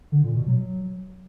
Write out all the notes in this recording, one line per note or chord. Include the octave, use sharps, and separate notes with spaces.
D3
A#2
B2
F#3